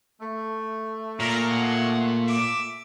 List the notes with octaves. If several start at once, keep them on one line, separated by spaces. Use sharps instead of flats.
A3
A#2 A#4
A#3 G#4 F#5
E5 D6